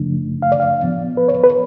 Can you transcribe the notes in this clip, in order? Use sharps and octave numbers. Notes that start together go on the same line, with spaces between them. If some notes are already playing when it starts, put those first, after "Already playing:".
Already playing: F#2 C#3 F3 A3 D4
F5
D5
F5
A2 F3 B3
B4
C#5
B4